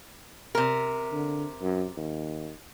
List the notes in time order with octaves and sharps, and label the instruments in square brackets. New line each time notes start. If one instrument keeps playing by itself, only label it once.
[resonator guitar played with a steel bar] C3 A#4
[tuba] D3
F#2
D#2